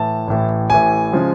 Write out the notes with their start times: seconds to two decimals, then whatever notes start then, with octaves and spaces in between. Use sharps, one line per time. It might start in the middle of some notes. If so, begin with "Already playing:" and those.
Already playing: A2 E3 A5
0.28 A1 A2 E3
0.70 A1 A2 E3 G#5
1.13 C#3 F3 G#3